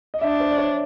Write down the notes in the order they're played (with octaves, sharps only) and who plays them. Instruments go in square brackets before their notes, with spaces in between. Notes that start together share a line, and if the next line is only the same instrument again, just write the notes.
[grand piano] D#5
[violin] D4 [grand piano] E5
[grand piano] C5
D5
C#5